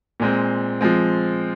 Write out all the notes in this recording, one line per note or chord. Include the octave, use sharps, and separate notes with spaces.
A#2 G#3 C4
F3 G#3 C4